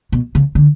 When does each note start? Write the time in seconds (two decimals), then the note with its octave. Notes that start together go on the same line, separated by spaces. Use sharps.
0.12 B2
0.35 C#3
0.55 D3